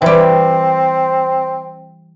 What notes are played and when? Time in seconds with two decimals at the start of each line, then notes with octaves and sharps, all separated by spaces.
0.02 E3 G3 C4